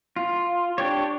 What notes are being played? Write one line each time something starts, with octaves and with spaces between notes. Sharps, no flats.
F4
D4 G4 C#5